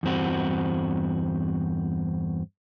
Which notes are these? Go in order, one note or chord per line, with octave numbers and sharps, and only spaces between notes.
E2 G2 C4 F#4